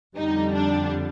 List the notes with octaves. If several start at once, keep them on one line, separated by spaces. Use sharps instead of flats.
F2 D3 G3 D#4
D4